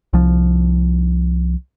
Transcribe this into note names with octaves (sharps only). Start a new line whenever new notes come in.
C2 F3